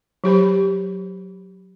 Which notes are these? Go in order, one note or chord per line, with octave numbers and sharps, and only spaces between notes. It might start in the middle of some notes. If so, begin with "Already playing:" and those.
F#3 G4 C5 B5